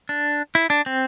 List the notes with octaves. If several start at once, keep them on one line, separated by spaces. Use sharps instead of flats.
D4
E4
D4
C4